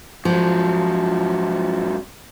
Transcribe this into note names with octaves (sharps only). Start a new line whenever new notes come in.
G#2 F3 F#3